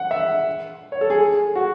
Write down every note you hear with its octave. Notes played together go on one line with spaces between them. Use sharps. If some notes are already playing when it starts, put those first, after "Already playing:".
Already playing: F#5
E5
C#5
A4
G#4
F#4